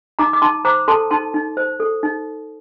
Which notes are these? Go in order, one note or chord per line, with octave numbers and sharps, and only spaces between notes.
D#4 A#5 D6
D6
D#4 A5 C6
C5 A#5 D6
A4 A5 C6
D#4 A5 C6
D#4
C5
A4
D#4